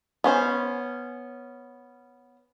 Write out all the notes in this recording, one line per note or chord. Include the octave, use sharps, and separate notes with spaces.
B3 C#4 C5